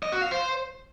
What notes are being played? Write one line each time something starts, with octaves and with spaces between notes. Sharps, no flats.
D#5
F#4
F5
C5